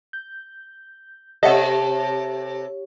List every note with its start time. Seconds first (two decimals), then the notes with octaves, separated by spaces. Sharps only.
0.13 G6
1.43 C3 G4 A4 C#5 D#5 E5 F#5